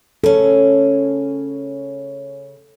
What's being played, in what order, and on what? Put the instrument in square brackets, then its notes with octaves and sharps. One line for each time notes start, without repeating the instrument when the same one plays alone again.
[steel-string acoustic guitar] C#3 C#4 [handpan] A4